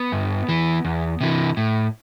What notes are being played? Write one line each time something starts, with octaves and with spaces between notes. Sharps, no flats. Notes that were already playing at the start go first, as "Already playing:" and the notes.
Already playing: B3
G2
E3
E2
C3 E3
A2